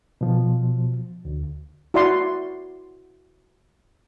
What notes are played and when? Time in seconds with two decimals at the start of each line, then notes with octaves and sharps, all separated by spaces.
0.21 B2 F3
1.25 D2
1.94 E4 F#4 D5 F#5 C6